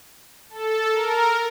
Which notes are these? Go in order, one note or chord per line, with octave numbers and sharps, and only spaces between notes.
A4
A#4